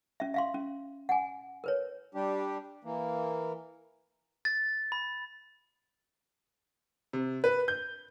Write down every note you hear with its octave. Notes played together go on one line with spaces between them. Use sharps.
C#4 E5
E5 F5 C6
C#4
F#5 G#5
A#4 B4 C#5
G3 D4 G4
E3 A#3
A6
B5
C3
B4
G6